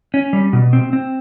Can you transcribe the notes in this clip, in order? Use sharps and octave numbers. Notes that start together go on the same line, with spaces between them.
C#4
G3
B2
C4
C4